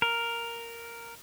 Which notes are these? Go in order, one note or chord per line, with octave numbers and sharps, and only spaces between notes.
A#4